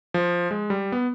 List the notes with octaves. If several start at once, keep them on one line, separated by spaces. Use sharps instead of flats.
F3
G#3
G3
B3